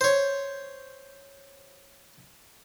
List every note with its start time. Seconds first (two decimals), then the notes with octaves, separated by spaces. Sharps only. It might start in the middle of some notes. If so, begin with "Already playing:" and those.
0.01 C5 C#5